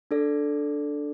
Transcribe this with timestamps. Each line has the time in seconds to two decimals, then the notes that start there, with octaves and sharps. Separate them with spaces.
0.11 D4 A4 D5